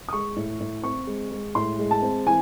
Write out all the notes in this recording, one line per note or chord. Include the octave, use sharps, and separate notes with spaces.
D#6
G#3 C#6
A2
A2
C4 C#6
G#3
G#3
A2 C6
G#3
A5
C4
E3 G#5